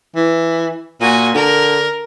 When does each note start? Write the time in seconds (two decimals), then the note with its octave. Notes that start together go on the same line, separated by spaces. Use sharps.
0.16 E3
1.01 A#2 F#4 G#5
1.35 D3 A#4